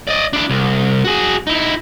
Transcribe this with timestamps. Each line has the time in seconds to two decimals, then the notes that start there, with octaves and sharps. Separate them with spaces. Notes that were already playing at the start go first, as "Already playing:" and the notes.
0.07 D5 D#5
0.33 D4 E4
0.50 C2
1.04 F#4 G#4
1.47 D#4 E4